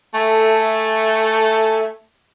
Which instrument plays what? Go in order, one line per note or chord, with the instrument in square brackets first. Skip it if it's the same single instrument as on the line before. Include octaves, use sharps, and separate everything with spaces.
[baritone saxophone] A3 [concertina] A4 E5 G#5